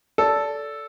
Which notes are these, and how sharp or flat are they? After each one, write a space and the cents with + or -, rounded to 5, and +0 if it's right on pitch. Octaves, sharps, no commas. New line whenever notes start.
A4 -5 D5 -25